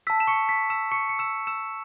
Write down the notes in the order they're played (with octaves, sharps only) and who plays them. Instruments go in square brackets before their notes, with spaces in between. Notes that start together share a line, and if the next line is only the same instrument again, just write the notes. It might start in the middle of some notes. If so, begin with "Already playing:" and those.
[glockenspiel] A5 E6 B6
E7
C#6 C#7
B6
E6 E7
C#6 C#7
C#7
E6 E7
E6 E7